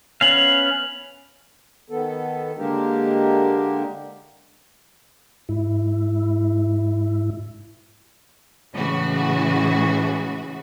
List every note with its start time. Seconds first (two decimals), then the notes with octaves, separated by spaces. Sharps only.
0.21 B3 C#4 F5 F7 F#7
1.89 D#3 B3 A4
2.58 D3 G#3 A#3 D4 G4 A#4
5.49 G#2 E4
8.74 A2 C#3 E3 G#3 F#4